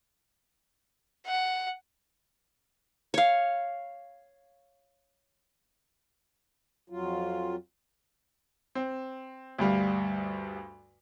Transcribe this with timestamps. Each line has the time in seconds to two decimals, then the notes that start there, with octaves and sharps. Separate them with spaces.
1.26 F#5
3.14 C#5 F5
6.90 F2 F#3 F4
8.75 C4
9.59 D2 G2 G3 F5